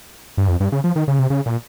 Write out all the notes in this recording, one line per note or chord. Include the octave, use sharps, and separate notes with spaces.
G2
F2
G2
C#3
F3
D#3
C#3
C3
C#3
A#2